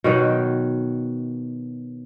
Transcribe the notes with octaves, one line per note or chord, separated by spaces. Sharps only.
B2 D#3 F#3